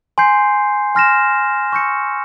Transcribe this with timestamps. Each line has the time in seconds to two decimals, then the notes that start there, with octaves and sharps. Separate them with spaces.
0.18 G#5 C6 G6 C7
0.95 G#5 C6 F6 A#6 E7
1.73 C#6 E6 G6 A#6 C#7